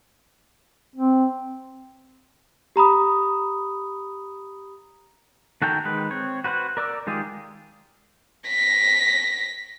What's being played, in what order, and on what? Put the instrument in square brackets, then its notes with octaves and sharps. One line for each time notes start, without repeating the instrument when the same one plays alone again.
[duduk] C4
[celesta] G4 A#5 B5 D#6
[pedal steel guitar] D#3 F#4 A4 A#4 G5
D#3 G#3 B4
C4 C#5
F#4 B4 C5 F5 F#5
A#4 D5 D6 E6
D#3 G#3 F4 G4 G#4
[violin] A#6 B6